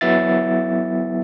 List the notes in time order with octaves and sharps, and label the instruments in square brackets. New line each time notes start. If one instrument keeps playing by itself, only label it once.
[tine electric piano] F#3 B3 E4 E5 A6